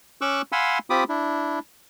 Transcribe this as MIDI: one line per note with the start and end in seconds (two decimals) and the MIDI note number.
0.21 0.42 61
0.21 0.42 85
0.21 0.42 86
0.21 0.42 88
0.21 0.42 90
0.52 0.79 77
0.52 0.79 78
0.52 0.79 80
0.52 0.79 83
0.52 0.79 84
0.52 0.79 88
0.90 1.04 60
0.90 1.04 65
0.90 1.04 67
0.90 1.04 83
0.90 1.04 86
0.90 1.04 87
1.09 1.59 62
1.09 1.59 64